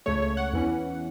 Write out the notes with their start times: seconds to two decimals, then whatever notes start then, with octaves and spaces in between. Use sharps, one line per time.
0.06 C#2 C#3 A3 C#5
0.22 C#5
0.37 F#5
0.53 E2 E3 C#4